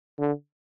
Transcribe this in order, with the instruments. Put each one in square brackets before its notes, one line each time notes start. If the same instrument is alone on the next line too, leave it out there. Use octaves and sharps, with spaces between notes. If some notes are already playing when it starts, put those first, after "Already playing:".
[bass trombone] D3